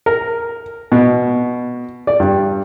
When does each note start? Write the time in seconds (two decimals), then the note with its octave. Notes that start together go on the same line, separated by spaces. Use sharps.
0.06 A#4
0.92 B2
2.07 D5
2.20 G2